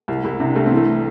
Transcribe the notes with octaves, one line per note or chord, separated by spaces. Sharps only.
C2
C2 E4
C3 D4
C2 A3
C4
E3 A3